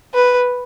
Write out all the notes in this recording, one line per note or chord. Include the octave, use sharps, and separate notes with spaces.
B4